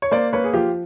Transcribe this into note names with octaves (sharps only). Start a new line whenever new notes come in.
C#5
A#3 C5 D5
A#3 B4 C#5
G#4
F3 F4 G4